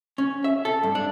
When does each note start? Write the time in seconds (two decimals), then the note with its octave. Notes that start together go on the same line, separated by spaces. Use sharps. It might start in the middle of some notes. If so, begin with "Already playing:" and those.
0.18 C#4
0.44 E5
0.65 A4
0.83 G2
0.95 D4